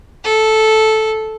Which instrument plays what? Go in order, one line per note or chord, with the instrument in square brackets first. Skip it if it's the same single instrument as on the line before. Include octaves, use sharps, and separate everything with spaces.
[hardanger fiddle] A4